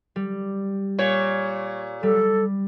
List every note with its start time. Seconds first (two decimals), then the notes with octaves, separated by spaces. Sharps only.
0.16 G3
0.99 A#2 C#5
2.03 G3 A4